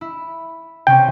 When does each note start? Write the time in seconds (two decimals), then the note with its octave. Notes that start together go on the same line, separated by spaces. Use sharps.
0.01 E4
0.87 C3 C#4 G5